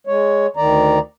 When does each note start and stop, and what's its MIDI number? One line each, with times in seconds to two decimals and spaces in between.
0.07 0.47 56
0.07 0.47 73
0.57 0.99 38
0.57 0.99 51
0.57 0.99 74
0.57 0.99 82